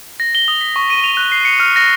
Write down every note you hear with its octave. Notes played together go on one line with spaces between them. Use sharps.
A#6
G7
D#6
B6
C#6
D#7
F7
F#6
C7
C#7
F6
A#6